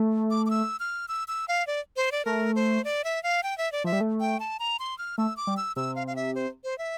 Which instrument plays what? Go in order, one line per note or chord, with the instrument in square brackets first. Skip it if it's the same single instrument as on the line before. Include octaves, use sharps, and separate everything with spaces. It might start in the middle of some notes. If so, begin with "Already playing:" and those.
Already playing: [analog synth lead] A3
[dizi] D6
D6
E6
F6
E6
E6
F5
D5
C5
D5
[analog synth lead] A3 [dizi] A#4
[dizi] C5
D5
E5
F5
G5
E5
D5
[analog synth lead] F3 [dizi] E5
[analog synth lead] G3
A3
[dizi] G5
A5
A#5
C6
F6
[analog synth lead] A3 [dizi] E6
[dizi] D6
[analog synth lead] G3
[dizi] E6
[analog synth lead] C3 [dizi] E6
[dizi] F5
F5
E5
C5
C5
E5